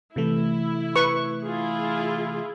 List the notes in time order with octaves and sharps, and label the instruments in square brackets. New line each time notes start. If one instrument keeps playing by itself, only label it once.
[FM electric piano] C3 E3 A3 [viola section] E4
[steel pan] B4 C#6
[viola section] E4 F4 G#4